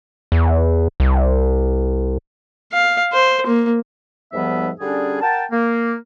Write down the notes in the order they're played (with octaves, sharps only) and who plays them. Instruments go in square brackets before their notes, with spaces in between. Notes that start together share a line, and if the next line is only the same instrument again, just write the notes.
[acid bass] E2
C2
[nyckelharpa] F5
C5
A#3
[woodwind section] D#2 G#2 F3 G3 B3 E5
D3 G3 C#4 D4 G#4
A#4 F#5 G5 A5
A#3